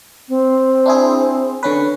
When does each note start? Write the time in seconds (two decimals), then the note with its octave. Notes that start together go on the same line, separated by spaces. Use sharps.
0.29 C4
0.86 D4 E4 G#4
1.63 D3 C#4 B4